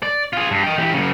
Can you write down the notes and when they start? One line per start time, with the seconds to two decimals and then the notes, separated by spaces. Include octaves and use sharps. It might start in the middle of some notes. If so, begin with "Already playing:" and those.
0.03 D5
0.33 F4 G#4
0.51 G2
0.63 D#5 G5
0.78 E3 G4
0.93 F#2 C#3